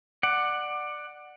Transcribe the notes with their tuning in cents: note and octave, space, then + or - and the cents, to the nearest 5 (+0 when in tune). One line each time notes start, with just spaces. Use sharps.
D5 +20 F#5 +0